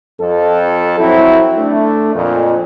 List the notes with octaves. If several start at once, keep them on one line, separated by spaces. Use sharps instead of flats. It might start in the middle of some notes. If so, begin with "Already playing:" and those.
F2 A4
F#3 C4 E4
A3 D4
F2 A#2